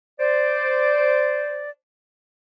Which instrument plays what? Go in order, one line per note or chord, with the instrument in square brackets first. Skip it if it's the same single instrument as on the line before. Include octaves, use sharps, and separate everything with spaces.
[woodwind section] C5 D5